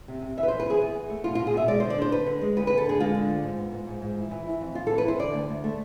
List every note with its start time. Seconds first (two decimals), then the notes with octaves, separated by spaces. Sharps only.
0.08 C3
0.22 C3
0.37 E3 E5
0.43 B4
0.48 F2 C5
0.60 B4
0.66 E3 G#4
0.82 E2
0.95 E2
1.10 A3
1.24 B2 F4
1.35 B2 F4
1.47 G#4
1.54 B2 E5
1.68 G#3 D5
1.80 D3 C5
1.90 D5
1.98 D4 C5
2.12 D3 B4
2.26 D3
2.41 G#3
2.57 D2 B4
2.67 D2 B4
2.78 A4
2.86 D3 G#4
3.00 G#3 F4
3.14 D3
3.30 D2
3.43 G#2
3.59 B3
3.73 G#2
3.87 G#2
4.02 G#2
4.17 E3
4.31 E3
4.47 E4
4.61 F2
4.75 F2 F4
4.87 E3 A4
4.98 B4
5.05 E4 C5
5.19 D3 D5
5.33 D2
5.49 D2
5.64 A3